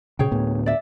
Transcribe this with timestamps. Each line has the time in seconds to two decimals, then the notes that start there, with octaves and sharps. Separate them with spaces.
0.19 A#2 C#3 G#4 C#5 G5
0.31 D2 A2 B3
0.66 D5 E5